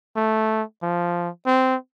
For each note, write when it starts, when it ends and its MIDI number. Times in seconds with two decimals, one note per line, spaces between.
0.16 0.63 57
0.83 1.29 53
1.46 1.76 60